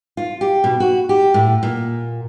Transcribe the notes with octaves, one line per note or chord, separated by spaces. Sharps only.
F4
G4
B2
F#4
G4
A2
A#2